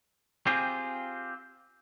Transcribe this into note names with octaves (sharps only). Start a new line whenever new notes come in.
C4 F4 G4 G#4